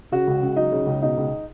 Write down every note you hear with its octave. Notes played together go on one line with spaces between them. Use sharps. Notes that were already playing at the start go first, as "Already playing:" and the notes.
C#3 F#4
C#2
C#2
F#3 D#4
C#3
C#2
B2 D#4
C#2